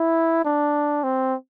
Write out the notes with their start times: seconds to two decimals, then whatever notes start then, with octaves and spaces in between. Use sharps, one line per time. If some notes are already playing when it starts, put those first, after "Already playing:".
Already playing: E4
0.45 D4
1.03 C4